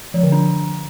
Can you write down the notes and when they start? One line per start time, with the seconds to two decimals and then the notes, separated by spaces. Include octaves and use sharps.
0.14 F3
0.23 D3
0.32 D4